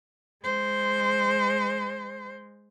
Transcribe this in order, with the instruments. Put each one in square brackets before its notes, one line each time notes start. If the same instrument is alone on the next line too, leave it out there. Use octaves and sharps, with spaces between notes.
[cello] G#3 C5